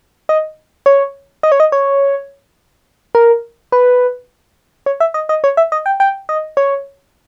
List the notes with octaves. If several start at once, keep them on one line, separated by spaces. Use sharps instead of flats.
D#5
C#5
D#5
C#5
D#5
C#5
A#4
B4
C#5
E5
D#5
D#5
C#5
E5
D#5
G5
G5
D#5
C#5